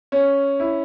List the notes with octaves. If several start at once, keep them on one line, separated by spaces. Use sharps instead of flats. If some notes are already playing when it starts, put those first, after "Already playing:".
C#4
E4